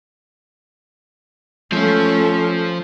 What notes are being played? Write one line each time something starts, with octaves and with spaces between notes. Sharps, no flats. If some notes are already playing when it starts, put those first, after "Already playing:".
F3 A3 C#4